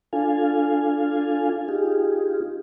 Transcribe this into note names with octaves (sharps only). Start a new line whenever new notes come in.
D4 F4 A4 F5 G#5
D#4 F4 G4 G#4